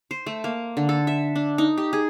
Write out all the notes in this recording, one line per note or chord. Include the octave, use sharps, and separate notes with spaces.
C5
A3
A#3
D3
A4
E5
D4
D#4
G4
G#4